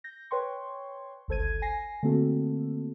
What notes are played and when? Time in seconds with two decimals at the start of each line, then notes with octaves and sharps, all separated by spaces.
0.04 G6 A#6
0.31 B4 C#5 G5 C6 C#6
1.28 G1 C#2 A4 C5 G#6 D#7
1.62 G#5 A#6 C7
2.03 D3 A3 A#3 C4 F#4 A4